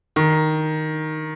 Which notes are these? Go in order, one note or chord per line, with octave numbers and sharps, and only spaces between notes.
D#3